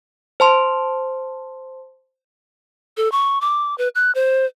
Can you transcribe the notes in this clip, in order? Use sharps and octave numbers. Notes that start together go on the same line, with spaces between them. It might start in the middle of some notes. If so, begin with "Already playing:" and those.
C5 A5 C6
A4
C#6
D6
B4
F#6
C5